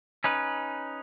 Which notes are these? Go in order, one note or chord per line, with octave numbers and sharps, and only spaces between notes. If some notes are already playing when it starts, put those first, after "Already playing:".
C#4 D#4 B4